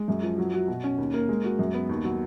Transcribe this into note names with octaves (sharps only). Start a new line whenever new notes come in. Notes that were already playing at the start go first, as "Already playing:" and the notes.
Already playing: G#3
F#2
F3
F#3
F#4
B2
C#4
D#2
A#3
G#3
F#4
F#2
B3
D#2
F#3